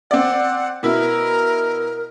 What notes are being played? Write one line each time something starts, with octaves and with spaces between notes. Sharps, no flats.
C4 D5 F#5
B2 E4 A#4